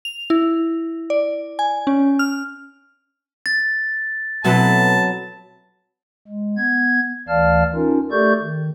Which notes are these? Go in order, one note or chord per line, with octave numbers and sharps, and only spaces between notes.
F7
E4
D5
G#5
C#4
F6
A6
B2 F#3 C4 E4 A4 B4 A5
G#3
B3 G#6
D2 E3 D5 F5 A5 F6
C#4 D#4 F4 A#4
A3 G4 A4 D5 C#6 G6
D#3